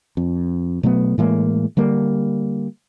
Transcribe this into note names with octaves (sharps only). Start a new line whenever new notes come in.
F2
B2 F#3 A3 B3
A2 E3 G#3 A#3
D3 G3 A#3